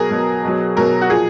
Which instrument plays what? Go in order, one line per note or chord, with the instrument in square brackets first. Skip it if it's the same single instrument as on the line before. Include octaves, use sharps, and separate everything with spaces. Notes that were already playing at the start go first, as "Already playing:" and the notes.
Already playing: [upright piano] B2 F#3 G#4 A#4
B2 F#3
B2 F#3
B2 F#3 A#4
F#4
A#2 F3 G#4